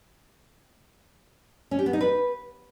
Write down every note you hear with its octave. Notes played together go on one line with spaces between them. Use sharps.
C#4
G4
B3
D#4
B4